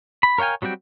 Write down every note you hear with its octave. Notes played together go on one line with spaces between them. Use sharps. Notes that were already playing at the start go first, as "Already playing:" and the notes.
B5
A#4 C#5 F5 G5 G#5
F#3 G3 C4 F#4 G5